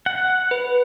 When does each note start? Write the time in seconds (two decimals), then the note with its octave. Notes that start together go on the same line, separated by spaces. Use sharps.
0.06 F#5
0.51 B4